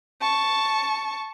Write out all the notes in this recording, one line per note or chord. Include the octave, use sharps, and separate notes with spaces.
A5 C#6